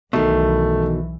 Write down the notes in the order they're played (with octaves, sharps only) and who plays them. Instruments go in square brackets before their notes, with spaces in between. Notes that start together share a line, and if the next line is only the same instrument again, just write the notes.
[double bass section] B1 E3 [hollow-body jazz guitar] B2 D#3 [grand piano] A3